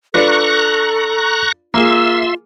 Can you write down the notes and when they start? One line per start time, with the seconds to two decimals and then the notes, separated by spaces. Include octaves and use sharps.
0.14 D4 F4 A4 B4 A#5 C#6 F#6
1.74 A#3 F4 G#4 E5 C6 E6